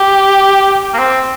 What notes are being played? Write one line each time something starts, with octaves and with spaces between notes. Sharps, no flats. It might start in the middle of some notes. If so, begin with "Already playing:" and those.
Already playing: G4
A#3
C4